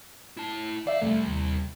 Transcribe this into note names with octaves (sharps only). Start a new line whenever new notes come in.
E4 A5
E3 D5 E5 F5
F2 C3 G3 A3
D#2